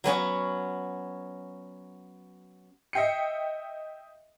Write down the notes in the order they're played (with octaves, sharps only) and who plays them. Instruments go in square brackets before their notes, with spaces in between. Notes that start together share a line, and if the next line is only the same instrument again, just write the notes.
[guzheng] F#3 B3 C#4 F#4
[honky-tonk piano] D#5 E5 G5 C7 C#7